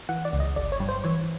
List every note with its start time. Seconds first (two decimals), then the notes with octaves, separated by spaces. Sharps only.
0.09 E3 F#5
0.25 D5
0.33 C#2
0.40 D#5
0.56 G1 D5
0.72 C#5
0.80 G2
0.89 C5
1.04 E3 C#5